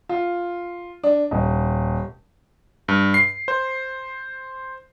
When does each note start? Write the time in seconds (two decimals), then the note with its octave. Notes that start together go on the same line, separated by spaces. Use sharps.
0.09 F4
1.03 D4
1.31 D#1
2.88 G2
3.14 C7
3.48 C5